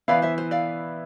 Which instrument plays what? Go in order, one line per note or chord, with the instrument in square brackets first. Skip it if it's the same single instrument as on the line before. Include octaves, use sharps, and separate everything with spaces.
[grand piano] E3 B3 E4 B4 [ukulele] D5 F5
[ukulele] C5 E5
C5
D5 F5